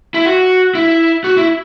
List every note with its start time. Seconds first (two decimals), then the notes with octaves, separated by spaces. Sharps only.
0.14 E4
0.25 F#4
0.75 E4
1.24 F#4
1.37 E4